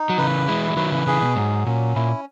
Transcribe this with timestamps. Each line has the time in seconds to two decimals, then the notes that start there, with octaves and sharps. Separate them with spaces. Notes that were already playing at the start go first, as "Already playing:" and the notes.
Already playing: D#4
0.09 F#3
0.17 C#3 E3 B4
0.48 E3 G#3 E4
0.70 G#3
0.77 D#3 F#3 B4
0.91 C#3 E3
1.07 C#3 E3 G#4
1.21 B2
1.36 G#2 F#3
1.66 A#2 C#4
1.95 A#2 E4